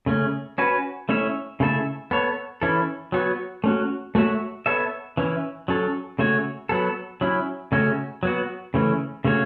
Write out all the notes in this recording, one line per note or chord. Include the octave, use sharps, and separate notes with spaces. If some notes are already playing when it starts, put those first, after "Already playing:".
C#3 A3 C#4
C#4 F#4 B4
A3 C#4 E4 C#5 E5
C#3 A3 E4 A4 E5
B3 A4 C#5
E3 C#4 E4 A4
F#3 B3 F#4 C#5
A3 C#4 F#4
A3 F#4 C#5 E5
B3 A4 C#5 E5
E3 C#4 E4
F#3 C#4 A4
C#3 A3 F#4 C#5
F#3 B3 A4
F#3 C#4 E4
C#3 A3 C#4 F#4
F#3 B3 F#4
C#3 E3 A3 C#4
C#3 A3 C#4 F#4 C#5